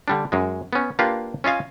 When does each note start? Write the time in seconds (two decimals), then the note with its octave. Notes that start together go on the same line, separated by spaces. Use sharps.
0.08 D3 G3 D4
0.32 F#2 G#3
0.73 B3 C#4
0.99 A#3 D4 F4 G4 B4 F5
1.44 C#4 F4 D#5 F5 G#5